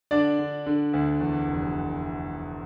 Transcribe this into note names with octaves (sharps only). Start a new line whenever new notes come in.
D3 D4 D5
D3
D3
D2
E2
F1